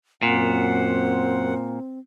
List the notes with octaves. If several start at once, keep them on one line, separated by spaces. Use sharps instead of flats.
F#2 A#2 C4 F#5